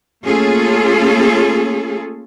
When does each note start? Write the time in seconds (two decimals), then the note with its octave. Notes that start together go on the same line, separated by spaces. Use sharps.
0.24 A3 A#3 C#4 F4 G#4 A4